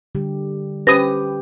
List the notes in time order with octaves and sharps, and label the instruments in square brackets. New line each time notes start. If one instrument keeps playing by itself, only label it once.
[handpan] D3 G3 G4
[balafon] C#4 C5 [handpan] G4 [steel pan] B4 D#6 [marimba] A#6